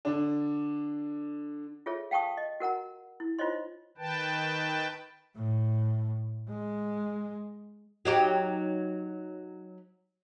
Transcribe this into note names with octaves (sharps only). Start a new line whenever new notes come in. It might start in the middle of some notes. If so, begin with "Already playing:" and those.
D3 D4
F4 G#4 A4 C#5 E5
F5 G5 A5 C#6 D#6
D#5
F#4 A#4 F#5 A#5
E4
D#4 F4 C5 C#5 D#5 C6
D#3 B4 G5 A5
A2
G#3
F#3 D#4 G4